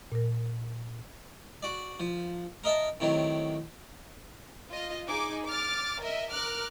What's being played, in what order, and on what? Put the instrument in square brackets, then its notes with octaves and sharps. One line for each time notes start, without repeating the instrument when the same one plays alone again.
[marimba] A#2 A#4
[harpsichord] F#4 D5
F3
A#4 D#5 E5 A5
A2 C3 D#3 F#3
[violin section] F4 D#5
D#4 G#4 D6
D6 F6 A6
A#4 D#5 E5
A#4 D6 F6 F#6